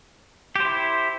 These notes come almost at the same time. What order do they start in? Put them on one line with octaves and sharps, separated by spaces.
G4 C5 E4